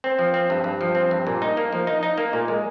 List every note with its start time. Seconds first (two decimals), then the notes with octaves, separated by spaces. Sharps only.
0.04 C4
0.19 F3
0.34 C4
0.50 G2
0.64 G2
0.81 F3
0.95 C4
1.11 G2
1.27 A#2
1.42 D#4
1.57 A#3
1.73 F3
1.87 D#4
2.03 D#4
2.18 A#3
2.33 A#2
2.48 G#3